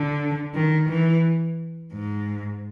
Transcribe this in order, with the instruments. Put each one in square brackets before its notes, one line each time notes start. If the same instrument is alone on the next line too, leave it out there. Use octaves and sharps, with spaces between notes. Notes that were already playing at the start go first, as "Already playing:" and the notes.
Already playing: [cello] D3
D#3
E3
G#2